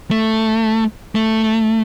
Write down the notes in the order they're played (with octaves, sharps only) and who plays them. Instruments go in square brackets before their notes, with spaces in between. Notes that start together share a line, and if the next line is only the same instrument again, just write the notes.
[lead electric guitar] A3
A3